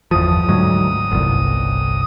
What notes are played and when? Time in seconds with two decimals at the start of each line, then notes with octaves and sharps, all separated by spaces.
0.11 G1 E2 F3 D#6
0.49 D2 G#2 F#3
1.12 G1 C2